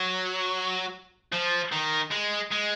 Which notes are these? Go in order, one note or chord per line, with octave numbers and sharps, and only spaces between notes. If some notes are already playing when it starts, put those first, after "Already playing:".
Already playing: F#3
F3
D#3
G#3
G#3